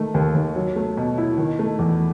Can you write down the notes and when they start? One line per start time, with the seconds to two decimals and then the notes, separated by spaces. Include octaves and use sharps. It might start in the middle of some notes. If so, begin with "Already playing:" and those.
Already playing: D#3 A3
0.14 D#2
0.35 D#2
0.55 F#3
0.76 A3
0.97 B2
1.18 E4
1.38 D#3
1.59 A3
1.79 E2